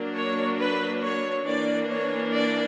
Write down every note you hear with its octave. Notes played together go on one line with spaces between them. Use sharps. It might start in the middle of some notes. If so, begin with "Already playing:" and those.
Already playing: F#3 A#3 D4
C#5
B4
C#5
E3 A#3 D4 D5
C#5
D5